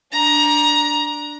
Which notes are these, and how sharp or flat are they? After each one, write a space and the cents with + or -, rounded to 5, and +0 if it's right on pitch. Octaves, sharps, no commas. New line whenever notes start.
D4 +0 A#5 +20